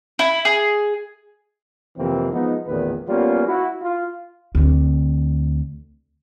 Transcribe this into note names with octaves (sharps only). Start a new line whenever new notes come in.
E4
G#4
F2 C3 E3 A#3 C4
F3 G#3 B3 D#4
A1 E2 A#2 D#3 B4
G3 A#3 B3 C#4 F4
E4 F#4
F4
D2 C4